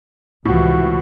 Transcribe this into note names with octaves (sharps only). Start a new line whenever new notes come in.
C#2 A2 C3 E3 F3 F#4